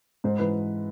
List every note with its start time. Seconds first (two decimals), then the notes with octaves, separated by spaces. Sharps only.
0.24 G#2 C5
0.39 E3 B4